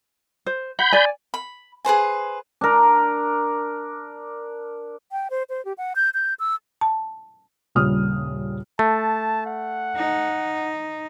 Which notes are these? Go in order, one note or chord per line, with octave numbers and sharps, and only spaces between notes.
C5
F#5 B5 G6
D5 G#5
B5
G#4 B4 C5 G#5
D4 A#4
G5
C5
C5
G4
F#5
G6
G6
E6
A5
D#1 A#1 C#3 G3 D#6 F6
A3 A5
F#5
D#4